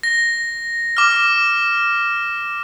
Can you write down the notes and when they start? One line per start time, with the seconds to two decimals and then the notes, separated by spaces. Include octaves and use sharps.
0.03 A#6
0.97 D6 F6